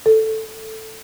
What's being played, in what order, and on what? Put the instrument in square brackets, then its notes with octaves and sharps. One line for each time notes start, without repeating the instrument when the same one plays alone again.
[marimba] A4